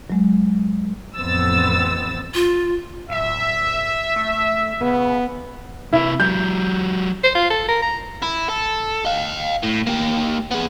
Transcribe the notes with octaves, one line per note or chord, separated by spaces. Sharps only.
F#3 G#3
A1 F2 B3 C4 E6 A6
F4
D1 E5
A3
C#3 B3
C3 E4 B4
F#3 G4 G6
C5
F4
A4
A#4
A#5
E4
A4
D#5 F5
A2
A#3 G4
B3 G#4